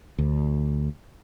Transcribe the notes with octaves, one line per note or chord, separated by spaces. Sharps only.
D2